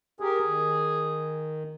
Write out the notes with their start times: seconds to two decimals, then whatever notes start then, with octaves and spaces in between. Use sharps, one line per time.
0.20 G4 G#4 A#4
0.46 D#3